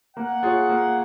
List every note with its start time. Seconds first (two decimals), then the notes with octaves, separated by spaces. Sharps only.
0.17 A#3 F#5
0.43 F4 G#4 C#5
0.69 A#3